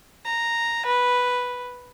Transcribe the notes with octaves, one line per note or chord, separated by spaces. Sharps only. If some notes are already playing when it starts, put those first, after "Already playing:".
A#5
B4